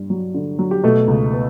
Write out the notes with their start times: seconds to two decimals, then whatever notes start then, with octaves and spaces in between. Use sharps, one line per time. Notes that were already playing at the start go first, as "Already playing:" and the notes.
Already playing: G2
0.10 F#3
0.34 D3
0.59 F#3
0.71 G4
0.83 B2 A3 A4
1.08 C#2
1.33 B3